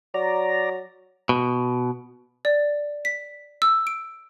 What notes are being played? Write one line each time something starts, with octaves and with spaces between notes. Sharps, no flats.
F#3 D5 A#5
B2
D5
B6
E6
D7